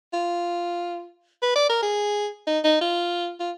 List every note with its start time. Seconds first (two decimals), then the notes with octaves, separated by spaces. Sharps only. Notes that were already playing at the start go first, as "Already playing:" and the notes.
0.14 F4
1.43 B4
1.56 D5
1.70 A#4
1.83 G#4
2.47 D#4
2.65 D#4
2.81 F4
3.40 F4